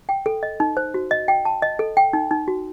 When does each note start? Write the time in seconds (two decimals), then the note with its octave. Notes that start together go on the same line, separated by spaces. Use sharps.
0.09 G5
0.26 A4
0.43 D#5
0.60 D#4
0.77 C5
0.94 F#4
1.11 D#5
1.28 G5
1.45 A5
1.62 D#5
1.79 A4
1.97 G5
2.13 D#4
2.31 D#4
2.48 F#4